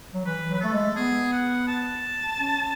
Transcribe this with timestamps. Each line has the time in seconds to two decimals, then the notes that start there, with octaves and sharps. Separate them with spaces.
0.13 F#3
0.25 E3 B4
0.49 F#3
0.54 B4
0.61 A3 A4
0.73 G#3
0.96 B3 G#4
1.33 F#5
1.68 A5
2.39 C#4